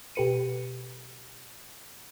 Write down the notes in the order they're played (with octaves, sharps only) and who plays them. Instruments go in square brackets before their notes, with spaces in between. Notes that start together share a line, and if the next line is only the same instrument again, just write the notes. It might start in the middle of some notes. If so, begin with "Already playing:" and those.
[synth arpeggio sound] B2 G4 A4 B4 C#7 D#7